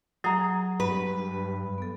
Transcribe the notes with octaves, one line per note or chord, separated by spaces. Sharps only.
F#3 G#4 A#5
G2 B4
B3 A4